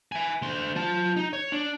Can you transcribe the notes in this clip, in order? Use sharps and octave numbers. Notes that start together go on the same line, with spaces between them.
E5 G#5
D2 C6
F4 A5
D#4
C#5
D4